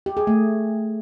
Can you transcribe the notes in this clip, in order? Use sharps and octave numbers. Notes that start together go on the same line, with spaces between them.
G4
G#4
A3